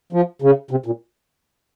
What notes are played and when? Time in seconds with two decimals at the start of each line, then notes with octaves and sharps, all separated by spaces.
0.13 F3
0.42 C#3
0.71 C3
0.86 A#2